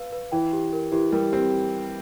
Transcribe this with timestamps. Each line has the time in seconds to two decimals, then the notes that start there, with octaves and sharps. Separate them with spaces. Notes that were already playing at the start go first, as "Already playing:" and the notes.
Already playing: B4 F5
0.12 B4
0.32 E3 G5
0.53 G4
0.73 A#4
0.92 E3 G4
1.12 G3 A#4
1.32 C4 G4